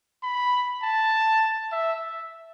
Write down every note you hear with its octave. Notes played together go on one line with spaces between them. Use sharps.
B5
A5
E5